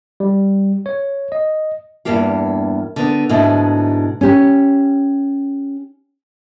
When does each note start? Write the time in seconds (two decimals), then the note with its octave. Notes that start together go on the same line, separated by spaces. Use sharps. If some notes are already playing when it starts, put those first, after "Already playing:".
0.20 G3
0.86 C#5
1.32 D#5
2.05 E2 G2 A#3 G4 F5
2.96 D3 B3
3.29 G#2 B2 D3 A3 D4 E4
4.21 C#4 G4